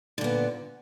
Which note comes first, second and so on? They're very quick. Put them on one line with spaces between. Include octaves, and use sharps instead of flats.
D3 A#2 B3